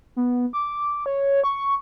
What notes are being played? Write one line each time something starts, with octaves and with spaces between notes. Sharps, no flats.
B3
D6
C#5
C#6